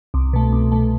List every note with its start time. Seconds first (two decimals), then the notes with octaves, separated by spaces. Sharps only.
0.14 C2
0.33 B2 A3
0.53 C2
0.72 B2 A3